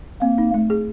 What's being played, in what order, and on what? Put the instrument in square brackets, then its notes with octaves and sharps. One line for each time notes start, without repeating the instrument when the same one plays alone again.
[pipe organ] A#3 [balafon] C4
[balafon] D#4
A3
G#4